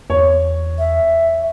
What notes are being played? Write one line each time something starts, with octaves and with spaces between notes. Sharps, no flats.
E2 C#5
E5